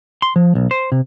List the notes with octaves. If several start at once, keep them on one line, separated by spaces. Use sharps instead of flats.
C6
F3
B1
C5
C3